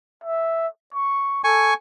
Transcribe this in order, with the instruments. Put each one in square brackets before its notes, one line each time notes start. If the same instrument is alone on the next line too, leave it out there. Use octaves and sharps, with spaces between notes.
[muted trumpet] E5
C#6
[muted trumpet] A4 [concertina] G#5 C#6